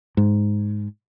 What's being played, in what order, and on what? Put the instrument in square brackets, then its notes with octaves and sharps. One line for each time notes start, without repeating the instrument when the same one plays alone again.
[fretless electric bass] G#2